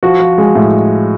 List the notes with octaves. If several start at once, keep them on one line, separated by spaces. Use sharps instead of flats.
F3 F#4
F3
G#3
A2